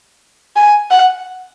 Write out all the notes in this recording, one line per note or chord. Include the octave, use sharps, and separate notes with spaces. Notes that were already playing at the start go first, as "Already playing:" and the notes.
G#5
F#5